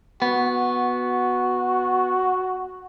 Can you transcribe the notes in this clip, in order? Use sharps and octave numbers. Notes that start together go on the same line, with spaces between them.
B3 F#4